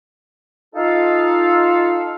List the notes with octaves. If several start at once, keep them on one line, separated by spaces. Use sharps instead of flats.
D#4 F4 A4 F5